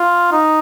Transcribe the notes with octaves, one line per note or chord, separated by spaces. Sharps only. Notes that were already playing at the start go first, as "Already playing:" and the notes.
Already playing: F4
D#4